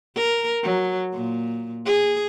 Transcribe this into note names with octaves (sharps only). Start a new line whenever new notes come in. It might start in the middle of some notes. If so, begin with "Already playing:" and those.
A#4
F#3
A#2
G#4